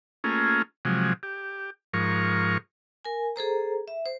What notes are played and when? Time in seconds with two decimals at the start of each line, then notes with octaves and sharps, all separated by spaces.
0.24 A3 A#3 C#4 F4 G#4
0.85 C3 F3 F#3 G#3
1.23 G4
1.93 G#2 F3 A#4 C#6
3.05 A#4 G#5
3.36 G#4 A4 C5 A#5
3.88 E5
4.06 C5